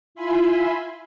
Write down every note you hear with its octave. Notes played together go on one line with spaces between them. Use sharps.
E4 F4 E5 G#5 B5 C6